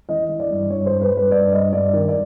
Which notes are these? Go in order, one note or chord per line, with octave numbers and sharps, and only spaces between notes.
E3 D#5
E3
D5
G2
G2 C#5
G2 C5
B4
G2
B4
G2 D5
G2 D#5
G2 D5
D#3
D5